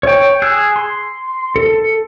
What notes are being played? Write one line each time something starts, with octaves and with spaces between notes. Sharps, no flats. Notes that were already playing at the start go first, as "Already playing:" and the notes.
C#5 G5
G#4 E6 F#6
C6
A4